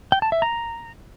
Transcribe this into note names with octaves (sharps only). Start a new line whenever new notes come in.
G5
A5
E5
A#5